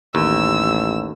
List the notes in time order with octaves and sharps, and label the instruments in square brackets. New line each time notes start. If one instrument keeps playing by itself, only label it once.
[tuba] A1 [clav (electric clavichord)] D#2 [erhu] E6